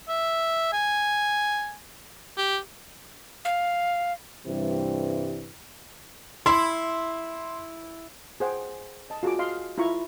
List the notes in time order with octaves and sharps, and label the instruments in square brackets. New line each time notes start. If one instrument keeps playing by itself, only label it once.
[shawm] E5
G#5
G4
[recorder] F5
[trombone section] G2 C3 E3 G3
[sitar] E4 [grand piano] C6
[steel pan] G#4 C5 F#5 G5
D#5 A5
F4 F#4 G#4 F#5 D6
D#5 F5 C6
E4 F4 A#5 C#6